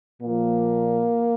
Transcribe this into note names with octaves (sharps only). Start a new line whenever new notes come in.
A#2 F3 A#3